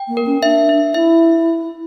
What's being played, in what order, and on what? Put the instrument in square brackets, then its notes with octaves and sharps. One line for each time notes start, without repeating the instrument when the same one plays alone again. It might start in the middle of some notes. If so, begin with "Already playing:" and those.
Already playing: [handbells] G5
[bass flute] A#3
[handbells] A#4
[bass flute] C#4
[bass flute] D4 [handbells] E5
[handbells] E5
[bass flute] E4 [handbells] E5